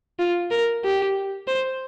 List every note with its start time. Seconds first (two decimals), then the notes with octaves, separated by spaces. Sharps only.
0.19 F4
0.51 A#4
0.84 G4
1.48 C5